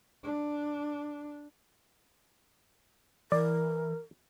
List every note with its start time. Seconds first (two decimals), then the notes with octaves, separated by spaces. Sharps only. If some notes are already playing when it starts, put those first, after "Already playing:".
0.23 D4
3.32 E3 A#4 D5